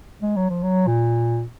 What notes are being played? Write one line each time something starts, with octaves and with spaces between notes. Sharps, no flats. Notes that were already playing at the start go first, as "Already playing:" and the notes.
G#3
F#3
F3
F#3
A#2